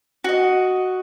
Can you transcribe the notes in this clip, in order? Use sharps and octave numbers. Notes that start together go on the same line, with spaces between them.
F#4 D#5